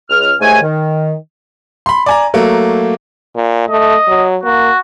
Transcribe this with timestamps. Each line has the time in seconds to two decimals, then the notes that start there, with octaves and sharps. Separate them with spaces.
0.09 C#2 F6
0.40 D#2 G#2 A3 G#5
0.62 D#3
1.86 B5 C6
2.06 D5 G#5 A#5
2.34 F#3 A3 A#3
3.35 A#2
3.69 A3 D#5
4.08 F#3
4.43 A#3 F#4